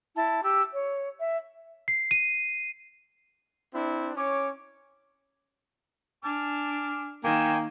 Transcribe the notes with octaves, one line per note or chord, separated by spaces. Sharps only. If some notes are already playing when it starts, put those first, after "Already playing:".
E4 A5
G4 E6
C#5
E5
C7
D#7
C4 D4 E4
C#4 C#5 D6
D4 G#5 A5 D6 F6
D#3 A#3 G5 G#5